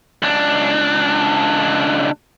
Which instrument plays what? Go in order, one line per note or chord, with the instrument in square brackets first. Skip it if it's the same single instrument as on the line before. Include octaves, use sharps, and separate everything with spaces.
[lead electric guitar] C#2 D4